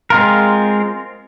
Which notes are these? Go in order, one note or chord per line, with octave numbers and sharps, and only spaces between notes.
G#3 C4 F4 A#4